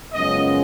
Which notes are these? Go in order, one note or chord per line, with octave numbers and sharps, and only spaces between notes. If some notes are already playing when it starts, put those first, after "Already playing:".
F#2 C#3 F3 G#3 B3 D#5